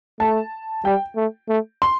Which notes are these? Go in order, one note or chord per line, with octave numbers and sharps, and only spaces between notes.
A3 A5
G3 G5
A3
A3
C6